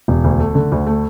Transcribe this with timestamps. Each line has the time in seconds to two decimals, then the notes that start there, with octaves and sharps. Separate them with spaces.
0.08 E1
0.24 D2
0.40 A3
0.55 D3
0.72 D2
0.87 A3